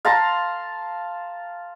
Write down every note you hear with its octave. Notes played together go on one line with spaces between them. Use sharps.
F5 A5 A#5 C6